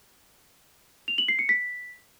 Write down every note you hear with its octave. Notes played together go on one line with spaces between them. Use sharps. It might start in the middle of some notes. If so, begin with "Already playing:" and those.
F7
F#7
C7
C#7
B6